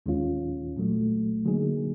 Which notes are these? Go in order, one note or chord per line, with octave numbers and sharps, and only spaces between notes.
D#2 D#3 G#3 C#4 F4
C2 A#2 F#3 A3
D3 F#3 A#3 D#4 G#4